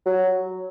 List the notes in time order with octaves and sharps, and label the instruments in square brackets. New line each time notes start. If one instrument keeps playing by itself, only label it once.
[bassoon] F#3